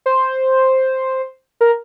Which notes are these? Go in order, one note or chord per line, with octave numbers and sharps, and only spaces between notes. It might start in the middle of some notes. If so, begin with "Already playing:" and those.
C5
A#4